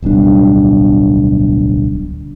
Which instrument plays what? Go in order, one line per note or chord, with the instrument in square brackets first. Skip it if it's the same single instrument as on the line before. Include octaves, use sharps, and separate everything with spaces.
[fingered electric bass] D1 B1 G3 D4